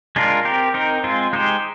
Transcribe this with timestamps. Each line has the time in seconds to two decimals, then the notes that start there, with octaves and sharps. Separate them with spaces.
0.16 G#3 D4 F4 A#4
0.45 C4 G4 A#4
0.74 C4 D#4 A#4
1.04 G#3 C4 F4
1.33 G#3 D#4 G4 C5